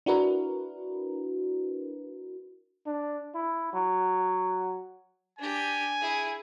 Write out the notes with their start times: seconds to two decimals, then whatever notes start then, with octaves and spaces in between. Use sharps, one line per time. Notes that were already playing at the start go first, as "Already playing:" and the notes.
0.06 D4 E4 F#4 A#4 B4
2.86 D4
3.35 E4
3.73 F#3
5.39 D4 G4 G#5
6.02 E4 G#4